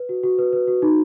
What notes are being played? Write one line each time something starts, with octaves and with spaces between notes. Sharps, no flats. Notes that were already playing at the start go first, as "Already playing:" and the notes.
Already playing: B4
F#4
F#4
B4
B4
F#4
D#4